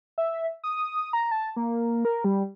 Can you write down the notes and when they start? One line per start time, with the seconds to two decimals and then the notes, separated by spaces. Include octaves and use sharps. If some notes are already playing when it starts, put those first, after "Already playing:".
0.18 E5
0.64 D#6
1.13 A#5
1.31 A5
1.56 A#3
2.05 A#4
2.24 G3